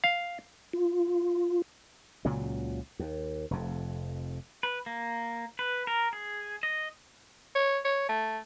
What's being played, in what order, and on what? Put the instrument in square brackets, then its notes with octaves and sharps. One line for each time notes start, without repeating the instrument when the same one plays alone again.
[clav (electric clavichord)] F5
[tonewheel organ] F4
[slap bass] C#2 A#2 C#3 F#3
D#2
F1 F2
[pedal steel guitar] B4
A#3
B4
A#4
G#4
D#5
[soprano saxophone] C#5
C#5
A3